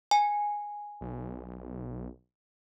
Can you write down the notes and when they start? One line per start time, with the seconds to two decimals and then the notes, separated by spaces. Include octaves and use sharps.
0.11 G#5
1.01 B1